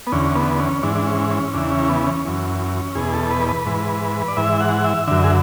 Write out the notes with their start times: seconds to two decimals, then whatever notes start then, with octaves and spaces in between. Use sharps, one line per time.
0.07 B3
0.12 E2 D3 C#4
0.35 B3
0.59 C#4
0.83 G#2 E3 D4
0.95 D4
1.07 C#4
1.30 C#4
1.54 E2 C#3 E3 D4
1.71 C#4
1.89 B3
2.07 C#4
2.25 F#2 E3
2.95 E2 B2 G#4
3.13 A4
3.31 B4
3.49 B4
3.66 G#2 E3
4.28 D5
4.37 G#2 E3 E5
4.61 F#5
4.84 E5
5.07 F#2 D3 E5
5.24 G#4